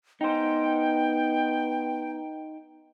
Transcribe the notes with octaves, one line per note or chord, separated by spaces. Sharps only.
B3 D#4 C5 G5